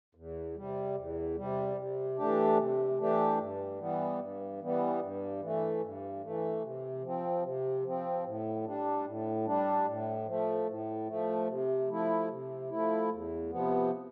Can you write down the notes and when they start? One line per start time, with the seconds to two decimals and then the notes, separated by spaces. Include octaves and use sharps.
0.15 E2
0.55 C3 G3
0.96 E2
1.36 C3 G3
1.77 C3
2.17 E3 A3 D4 G4
2.57 C3
2.98 E3 A3 D4 G4
3.39 G2
3.79 E3 G3 B3
4.19 G2
4.60 E3 G3 B3
5.00 G2
5.41 E3 A3
5.81 G2
6.22 E3 A3
6.62 C3
7.03 F3 C4
7.43 C3
7.84 F3 C4
8.25 A2
8.65 G3 D4
9.05 A2
9.46 G3 D4
9.86 A2
10.26 F3 A3
10.67 A2
11.07 F3 A3
11.49 C3
11.89 F3 A3 E4
12.29 C3
12.69 F3 A3 E4
13.10 E2
13.50 C3 F3 B3